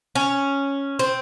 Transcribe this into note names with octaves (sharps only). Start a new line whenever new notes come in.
C#4
C4